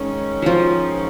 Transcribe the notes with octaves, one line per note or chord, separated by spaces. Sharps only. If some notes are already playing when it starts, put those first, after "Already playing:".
Already playing: G#2 D#3 G#3 C#4
F3 F#3